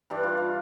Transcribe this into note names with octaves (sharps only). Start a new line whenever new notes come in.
G2 E3 G3 D4
F4
F4